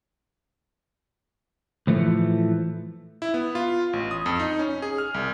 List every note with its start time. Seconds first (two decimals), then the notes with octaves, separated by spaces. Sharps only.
1.87 A2 E3 F3 A3
3.22 E4
3.34 B3
3.55 F4
3.93 A1
4.11 D#6
4.26 F2
4.39 D#4
4.59 C#4
4.82 G#4
4.98 F6
5.14 C2